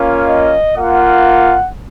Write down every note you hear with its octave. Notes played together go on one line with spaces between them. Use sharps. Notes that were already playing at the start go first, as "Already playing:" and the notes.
Already playing: A#3 C#4 F4
D#5
A#3 F4 F#5